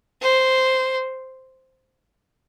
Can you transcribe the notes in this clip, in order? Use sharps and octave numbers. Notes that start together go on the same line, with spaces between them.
C5